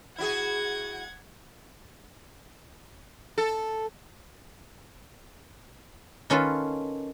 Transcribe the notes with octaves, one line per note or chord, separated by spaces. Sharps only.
E4 F#4 G#4 F#5 G#6
A4
D#3 C#4 F4 A4 B4